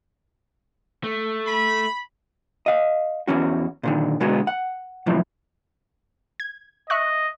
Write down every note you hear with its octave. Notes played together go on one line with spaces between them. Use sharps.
A3
B5
D#5 F5
E2 E3 C#4 F#4
A#2 D3 D#3
B2 D3 G#3 B3 F#4
F#5
F#2 A2 C3 E3 F3
G#6
D#5 E5 C#6 F#6